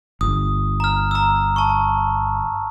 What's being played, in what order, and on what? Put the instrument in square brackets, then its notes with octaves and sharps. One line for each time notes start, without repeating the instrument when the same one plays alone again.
[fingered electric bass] G1 [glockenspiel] D#6
[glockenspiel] A#5 F6
A#5 E6
A5 C#6